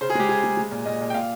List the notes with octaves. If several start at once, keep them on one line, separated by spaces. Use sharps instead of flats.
C#3 C5
G#4
G#3 G4
C#3 G#4
G#3
G#3
A#2
A#2 D#5
A#2
G5
A#2 F5